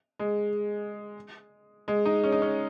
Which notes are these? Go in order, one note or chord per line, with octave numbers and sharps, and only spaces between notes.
G#3
G#3
D#4
C#4
D#4
C#4